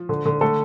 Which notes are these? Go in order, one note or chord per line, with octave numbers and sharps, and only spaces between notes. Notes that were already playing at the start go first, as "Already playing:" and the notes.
Already playing: F3
D3
D3
D3 A3 A4